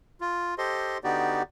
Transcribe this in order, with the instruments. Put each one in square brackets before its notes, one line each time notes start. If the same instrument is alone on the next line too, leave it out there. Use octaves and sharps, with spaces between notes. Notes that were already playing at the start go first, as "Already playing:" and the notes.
[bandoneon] F4
G4 A4 C5 D#5 C6
D3 B3 D#4 F#4 G4 D5